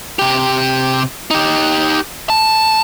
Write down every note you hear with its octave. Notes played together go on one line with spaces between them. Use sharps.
C3 G4
D#4 G4
A5